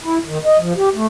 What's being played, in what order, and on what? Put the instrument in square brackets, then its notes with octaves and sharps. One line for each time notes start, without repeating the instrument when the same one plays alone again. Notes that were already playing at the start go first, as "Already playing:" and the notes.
[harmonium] E4
D#3
D#5
F3
G4
A3